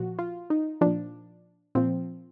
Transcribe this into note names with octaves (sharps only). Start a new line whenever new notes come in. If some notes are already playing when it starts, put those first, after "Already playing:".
Already playing: A#2 F3 F#4
F4
D#4
A#2 F3 D4
A#2 F3 C4